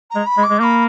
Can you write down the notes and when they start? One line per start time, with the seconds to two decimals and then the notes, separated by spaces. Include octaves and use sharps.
0.10 A#5
0.15 G#3
0.26 B5
0.38 G#3
0.43 D6
0.49 G#3
0.59 A#3 B5 D6